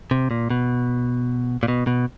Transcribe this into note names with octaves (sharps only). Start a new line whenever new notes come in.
C3
A#2
B2
A#2
B2
B2